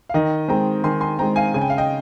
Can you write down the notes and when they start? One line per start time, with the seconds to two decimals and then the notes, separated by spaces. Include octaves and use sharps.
0.09 F5
0.14 D#3 D#5 G5
0.48 G#3 C4 G5 A#5
0.84 D#3 G#5 C6
1.01 G#5 C6
1.19 G#3 C4 G5 A#5
1.36 F5 G#5
1.54 C#3 G#5
1.61 G5
1.70 F5
1.78 D#5 G5